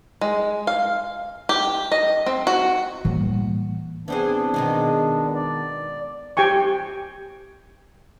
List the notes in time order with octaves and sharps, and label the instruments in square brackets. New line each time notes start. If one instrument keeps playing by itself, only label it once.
[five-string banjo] G#3
F5
G4
D#5
C4
F#4
[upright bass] A2 [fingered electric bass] E3 G3 A#3
[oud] E3 C4 G#4 [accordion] B3 D4
[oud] B2 D#3 G#3
[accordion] D5
[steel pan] G4 G5 G#5 C#6